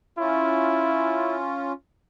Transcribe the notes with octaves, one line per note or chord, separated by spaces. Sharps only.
C#4 E4 F4